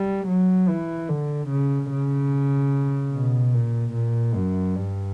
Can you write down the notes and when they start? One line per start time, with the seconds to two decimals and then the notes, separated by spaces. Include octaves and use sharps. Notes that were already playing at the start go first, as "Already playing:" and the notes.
Already playing: G3
0.28 F#3
0.69 E3
1.09 D3
1.49 C#3
1.91 C#3
3.12 B2
3.54 A#2
3.94 A#2
4.35 F#2
4.75 G2